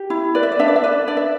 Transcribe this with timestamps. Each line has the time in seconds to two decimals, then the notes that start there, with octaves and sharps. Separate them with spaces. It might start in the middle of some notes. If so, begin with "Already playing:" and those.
Already playing: G4
0.10 E4
0.35 B4 D5
0.43 E5
0.52 D5
0.59 D4 E5
0.68 D5
0.76 E5
0.84 B4 D5
1.08 D4 D5
1.17 E5